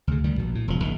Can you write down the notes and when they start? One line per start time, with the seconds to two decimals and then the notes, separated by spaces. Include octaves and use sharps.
0.07 D2 C#3
0.24 D2 D#3 G3
0.38 A#1 B2
0.55 A2
0.68 E1 F3
0.82 A#1 D#3